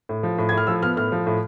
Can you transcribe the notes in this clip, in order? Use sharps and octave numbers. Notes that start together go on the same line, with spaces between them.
A2
F3
A2
A2 G#6
F6
F3 E6
B3 F6
A2 F6
F3
A2